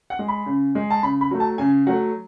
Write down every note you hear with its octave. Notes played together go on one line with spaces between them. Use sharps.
F#5
G#3
B5
C#3
G#3
A5
C#3 B5
B5
F#3 A3
A5
C#3 G#5
F#3 A3 F#5